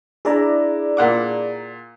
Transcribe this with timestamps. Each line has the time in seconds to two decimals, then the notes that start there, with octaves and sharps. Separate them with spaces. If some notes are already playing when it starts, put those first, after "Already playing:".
0.25 D4 E4 G#4 D5 A#5
0.97 A#2 F#5 D6